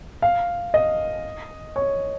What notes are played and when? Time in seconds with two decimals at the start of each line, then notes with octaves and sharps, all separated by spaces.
0.22 F5
0.74 D#5
1.76 C#5